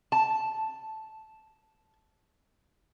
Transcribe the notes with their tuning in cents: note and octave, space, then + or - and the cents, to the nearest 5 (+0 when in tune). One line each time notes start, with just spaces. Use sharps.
A5 -10